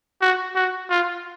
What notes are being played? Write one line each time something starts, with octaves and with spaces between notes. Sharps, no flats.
F#4
F#4
F4